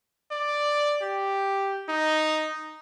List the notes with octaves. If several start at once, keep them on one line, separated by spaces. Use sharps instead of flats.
D5
G4
D#4